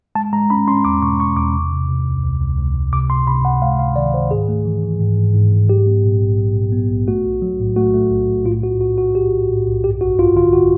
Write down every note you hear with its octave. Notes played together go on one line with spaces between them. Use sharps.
G#3 A5
G#3 A#5
C#4 B5
C#4 C6
E2 D6
B2 C#6
G#3 C#6
E2 D6
C3
C3
C3
C#2
C#2
C#2
C#2
C#2
C3 D6
C3 C6
C3 B5
C3 F#5
G#3 F5
C3 F5
D#3 D5
D#3 C5
G#2 G#4
A3
E3
E3
G#2
G#2
G#2
G#2
F#3 G4
B3
A#2
A#1
F#3
A#2
B3
A#1
A3 F#4
B1
F#3
A2
A3 F#4
A3
B1
B1
A2 F4
A2 F#4
B1 F#4
A2 F#4
B1 G4
B1
A2
B1
G2 G4
A1 F#4
G2 F4
D3 F4
F#4